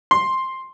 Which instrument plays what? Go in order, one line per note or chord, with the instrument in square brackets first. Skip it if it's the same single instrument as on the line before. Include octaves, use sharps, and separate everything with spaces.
[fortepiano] C6